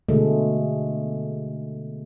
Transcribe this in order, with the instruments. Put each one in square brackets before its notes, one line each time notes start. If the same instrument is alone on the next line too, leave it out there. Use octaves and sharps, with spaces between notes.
[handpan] B2 D3 G#3 A3